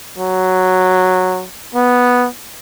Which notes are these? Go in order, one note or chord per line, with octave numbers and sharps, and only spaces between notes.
F#3
B3